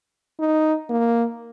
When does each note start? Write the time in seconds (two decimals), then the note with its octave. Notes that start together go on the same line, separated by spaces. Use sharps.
0.40 D#4
0.90 A#3